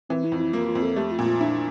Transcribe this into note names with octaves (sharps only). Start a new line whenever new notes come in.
E3 C4
E4
F2
E4
A#3 F4
F4
F2
A4
A3 G4
F4
A#2
F4
D4 E4